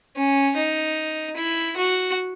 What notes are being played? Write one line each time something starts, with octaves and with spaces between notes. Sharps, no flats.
C#4
D#4
E4
F#4